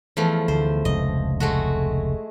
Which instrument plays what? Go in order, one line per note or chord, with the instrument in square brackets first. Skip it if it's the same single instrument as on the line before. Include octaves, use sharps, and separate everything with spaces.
[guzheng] E2 F3 A3
[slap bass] D2 D3 [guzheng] C5
[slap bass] F1 C#2 [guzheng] D#5
[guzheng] G#3 A3 F#4